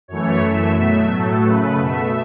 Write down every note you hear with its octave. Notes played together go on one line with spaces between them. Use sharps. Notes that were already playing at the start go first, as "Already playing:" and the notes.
F#2 E3 A3 C#5
F#2 E3 A3 E5
B2 F#3 A3 E5
A2 F#3 A3 A4
F#2 C#3 A3 B4
B2 A3 E5